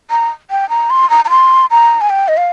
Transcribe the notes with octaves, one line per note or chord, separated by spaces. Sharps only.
A#5
G5
A#5
C6
A#5
A#5
C6
A#5
G#5
G5
D#5
F5